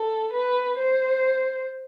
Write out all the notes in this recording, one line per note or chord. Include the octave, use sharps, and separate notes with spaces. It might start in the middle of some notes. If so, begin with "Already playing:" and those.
Already playing: A4
B4
C5